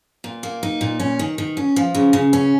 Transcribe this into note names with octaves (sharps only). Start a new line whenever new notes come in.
A#2
A#3
D#4
A#2
C#4
D#3
D#3
C#4
F3
C#3
C#3
C#4